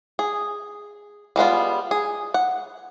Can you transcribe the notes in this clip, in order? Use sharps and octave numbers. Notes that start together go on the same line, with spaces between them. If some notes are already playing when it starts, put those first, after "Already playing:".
G#4
G3 G#3 B3 F4
G#4
F#5